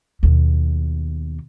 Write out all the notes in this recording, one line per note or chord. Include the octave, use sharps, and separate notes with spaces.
D#2 B2